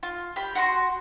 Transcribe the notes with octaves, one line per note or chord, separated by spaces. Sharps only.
F4
G4 B5
F#4 B5 C6